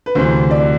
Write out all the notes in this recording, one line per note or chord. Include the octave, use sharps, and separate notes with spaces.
B4
D2 C3 E3 C5
D5